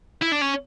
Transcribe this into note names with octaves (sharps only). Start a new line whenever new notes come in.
E4
D4
C#4